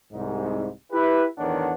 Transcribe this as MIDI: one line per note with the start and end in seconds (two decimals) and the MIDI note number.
0.13 0.68 36
0.13 0.68 44
0.92 1.25 64
0.92 1.25 67
0.92 1.25 71
1.38 1.73 40
1.38 1.73 45
1.38 1.73 51
1.38 1.73 62
1.38 1.73 73
1.38 1.73 78